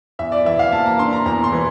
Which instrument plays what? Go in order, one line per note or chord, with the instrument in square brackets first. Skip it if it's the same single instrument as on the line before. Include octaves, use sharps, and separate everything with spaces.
[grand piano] E2 [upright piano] E5
[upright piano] D5
[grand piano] E3 [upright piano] E5
[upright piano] F5
[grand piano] A#3 [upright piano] A5
[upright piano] A#5
[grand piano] D4 [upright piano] C6
[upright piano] A#5
[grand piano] E2 [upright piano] A#5
[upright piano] C6
[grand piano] E3